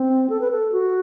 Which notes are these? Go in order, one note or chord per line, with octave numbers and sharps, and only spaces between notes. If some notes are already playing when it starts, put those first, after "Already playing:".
Already playing: C4
A4
B4
A4
F#4